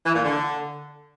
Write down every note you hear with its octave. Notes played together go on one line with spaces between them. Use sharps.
E3
A#2
D3